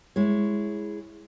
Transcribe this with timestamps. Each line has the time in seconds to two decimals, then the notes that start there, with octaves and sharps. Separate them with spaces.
0.16 G#3 E4 C#5